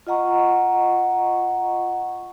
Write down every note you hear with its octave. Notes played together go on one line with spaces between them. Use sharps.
F4 D#5 F#5 A#5 C#6